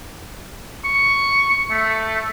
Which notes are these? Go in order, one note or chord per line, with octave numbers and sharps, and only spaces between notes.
C#6
A3